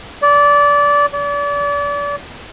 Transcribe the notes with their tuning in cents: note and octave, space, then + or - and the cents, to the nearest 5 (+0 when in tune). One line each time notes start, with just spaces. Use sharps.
D5 -20
D5 -35